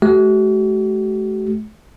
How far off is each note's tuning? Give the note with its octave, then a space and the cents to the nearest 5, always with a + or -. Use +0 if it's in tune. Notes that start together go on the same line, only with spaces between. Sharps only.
A3 -40 F#4 +45